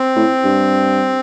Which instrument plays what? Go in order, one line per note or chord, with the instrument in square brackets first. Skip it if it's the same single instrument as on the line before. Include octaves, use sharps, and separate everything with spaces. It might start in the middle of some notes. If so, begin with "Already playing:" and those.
Already playing: [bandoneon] C4
[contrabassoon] A2
G2